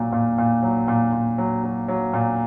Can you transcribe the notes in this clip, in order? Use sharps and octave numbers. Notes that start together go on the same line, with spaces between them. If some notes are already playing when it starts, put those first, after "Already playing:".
Already playing: A#2 F#3
A#2
A#2
F#3
A#2
A#2
F#3
F#3
F#3
A#2